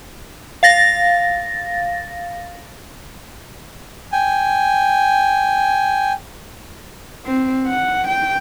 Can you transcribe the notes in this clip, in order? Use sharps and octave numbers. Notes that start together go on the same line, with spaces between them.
F5 A6 A#6
G5 G#5
C4
F#5
G5